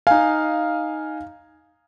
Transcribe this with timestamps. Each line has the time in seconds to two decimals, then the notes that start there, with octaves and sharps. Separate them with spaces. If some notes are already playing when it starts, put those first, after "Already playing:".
0.07 D#4 F5 G#5